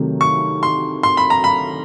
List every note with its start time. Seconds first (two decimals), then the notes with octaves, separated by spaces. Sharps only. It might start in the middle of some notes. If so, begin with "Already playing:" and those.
Already playing: C3 D#3 F#3 A3
0.21 C#6
0.63 C6
1.03 C6
1.17 B5
1.30 A#5
1.44 B5